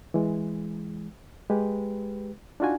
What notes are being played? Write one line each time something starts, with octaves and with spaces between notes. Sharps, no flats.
E3 G#3
G#3 G4 B4
D4 D#4 F4 F#4 G#5